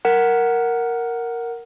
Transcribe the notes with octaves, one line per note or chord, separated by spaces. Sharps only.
A#4 F#5